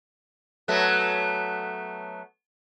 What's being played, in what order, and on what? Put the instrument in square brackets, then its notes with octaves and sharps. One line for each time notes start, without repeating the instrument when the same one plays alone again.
[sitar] F#3 A3 B3